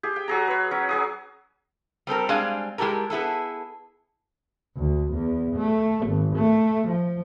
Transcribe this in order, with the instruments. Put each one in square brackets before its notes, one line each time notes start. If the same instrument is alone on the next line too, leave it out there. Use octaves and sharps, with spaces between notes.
[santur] G4 G#4
G5
F#3 G#4 A#5
B4 C#5
F#3 C#4
F#3 G#4 D#6
[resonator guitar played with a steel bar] G3 C4 A4 A#4
G3 G#3 C4 D4 F5 G#5
G#3 E4 G4 A4 A#4
B3 E4 G#4 A4
[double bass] D2
E2
A3
G#1
A3
F3